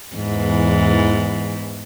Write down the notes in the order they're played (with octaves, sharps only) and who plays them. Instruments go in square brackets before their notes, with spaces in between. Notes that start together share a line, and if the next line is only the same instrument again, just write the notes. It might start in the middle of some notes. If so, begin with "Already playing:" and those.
[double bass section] E2 E3 [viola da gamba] G#2